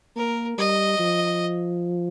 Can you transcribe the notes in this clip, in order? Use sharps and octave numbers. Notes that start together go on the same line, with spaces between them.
A#3 A#4
G3 D#5
F3